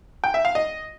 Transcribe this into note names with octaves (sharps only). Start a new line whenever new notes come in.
G5
E5
F5
D#5